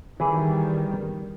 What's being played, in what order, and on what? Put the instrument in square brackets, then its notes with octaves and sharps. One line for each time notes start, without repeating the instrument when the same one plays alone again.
[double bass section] D#3 G3 [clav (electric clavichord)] E3 E4 G#4